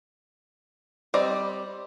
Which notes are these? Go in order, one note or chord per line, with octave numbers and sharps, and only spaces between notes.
G3 C4 D5 D#5